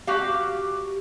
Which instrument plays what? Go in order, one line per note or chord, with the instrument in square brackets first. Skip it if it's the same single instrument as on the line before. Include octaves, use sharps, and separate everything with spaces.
[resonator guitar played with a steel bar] F#4 G4 F5